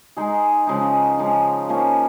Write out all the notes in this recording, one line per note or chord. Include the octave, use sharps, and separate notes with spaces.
G#3 D#4 G#4
C#3 F3 G#3 D#4
C#3 F3 G#3 D#4
F3 A#3 C#4 G#4